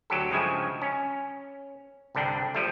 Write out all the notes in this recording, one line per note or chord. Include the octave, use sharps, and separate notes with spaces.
D2 F#3 G4 A4
G2 C#3 F3 G#3 E5 G#5
C#4
C2 G2 D3 D4 G5
F3 G3 A3